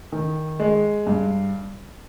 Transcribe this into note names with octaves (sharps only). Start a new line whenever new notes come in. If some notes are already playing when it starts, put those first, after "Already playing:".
D#3
G#3
G2